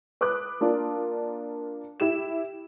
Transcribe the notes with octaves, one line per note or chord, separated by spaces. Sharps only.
B4 D6 D#6 F#6
A#3 D4 F4 D5
E4 G4 E7